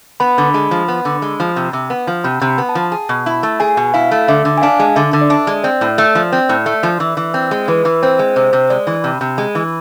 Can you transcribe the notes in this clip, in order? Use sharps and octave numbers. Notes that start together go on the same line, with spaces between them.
B3 B5
D3
G#3
F3
B3
D3
G#3
F3
C3
C3
B3
F3
C3 B5
C3
B5
B3
A5
F3
G#4
B2
E4
A3
G#4 G#5
B2
E4 F5
A3
D3 E5
D3
G#5
D4 F5
G#3
D3 E5
D3
D5
D4 E5
G#3
C4 D5
A2
A3
F3
C4
A2
A3
F3
E3
E3
C4
G#3
E3 B4
E3
C4 C5
G#3
C3 C5
C3
G#3 D5
E3
C3 B5
C3
G#3
E3